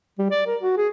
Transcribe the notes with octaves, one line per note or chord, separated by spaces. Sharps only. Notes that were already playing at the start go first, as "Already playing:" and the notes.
G3
D5
A#4
F#4
G#4